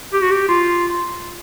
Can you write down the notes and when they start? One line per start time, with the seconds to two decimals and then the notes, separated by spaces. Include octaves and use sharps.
0.13 G4
0.22 F#4
0.31 G4
0.48 F4